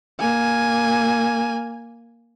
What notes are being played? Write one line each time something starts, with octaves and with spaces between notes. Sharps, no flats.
A#3 G#5